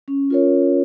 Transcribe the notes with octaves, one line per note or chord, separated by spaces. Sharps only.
C#4
F4 A#4 C#5